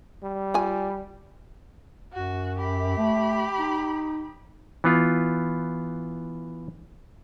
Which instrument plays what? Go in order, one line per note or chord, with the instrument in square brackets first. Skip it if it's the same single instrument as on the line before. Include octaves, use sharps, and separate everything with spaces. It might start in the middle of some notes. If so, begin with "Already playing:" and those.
[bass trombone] G3
[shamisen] F4 G#5
[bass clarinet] F#2 [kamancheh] F#4
[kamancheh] G4 B5
[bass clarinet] A3
D#4
[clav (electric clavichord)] E3 B3 F4